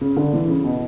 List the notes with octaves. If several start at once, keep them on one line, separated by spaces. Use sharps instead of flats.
C#3
D3
E3
C#3
B2